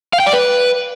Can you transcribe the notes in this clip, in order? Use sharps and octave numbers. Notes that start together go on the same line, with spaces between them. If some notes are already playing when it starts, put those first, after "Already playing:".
F5
G5
D5
B4